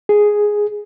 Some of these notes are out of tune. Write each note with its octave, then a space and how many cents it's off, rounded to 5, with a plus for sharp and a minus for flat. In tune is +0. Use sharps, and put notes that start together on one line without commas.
G#4 +0